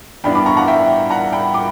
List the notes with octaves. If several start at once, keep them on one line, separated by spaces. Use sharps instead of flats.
G2 E3 B3 D4 G5 B5
B5 D6
A#5 C#6
F#5 A#5
E5 G5
F#5 A#5
G5 B5
B5 D6